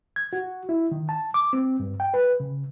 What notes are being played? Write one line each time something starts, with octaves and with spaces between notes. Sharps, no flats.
G#6
F#4
E4
D#3
A5
D6
C4
G2
G5
B4
C#3